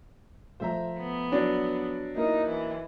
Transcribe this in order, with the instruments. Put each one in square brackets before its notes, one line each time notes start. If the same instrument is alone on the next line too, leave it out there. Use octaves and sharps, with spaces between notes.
[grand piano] F3 A3 F4 [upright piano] C5 E5 A#5
[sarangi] B3
[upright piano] F#3 D4 D5
[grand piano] A#3 E4 A#4 [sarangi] D#4
[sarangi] E3